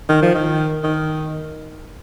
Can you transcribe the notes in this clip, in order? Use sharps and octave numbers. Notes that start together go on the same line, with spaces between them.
D#3
F3
D#3
D#3